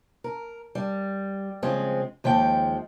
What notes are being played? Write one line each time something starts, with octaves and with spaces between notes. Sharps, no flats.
A#4
G3
C#3 F3 G#3 C4
D#2 F3 G#3 G5